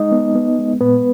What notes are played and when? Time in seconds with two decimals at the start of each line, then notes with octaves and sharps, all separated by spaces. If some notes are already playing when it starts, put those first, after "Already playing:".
Already playing: G#3 D#4 D#5
0.12 B3
0.35 B3
0.59 G#3
0.81 A#2 B3 B4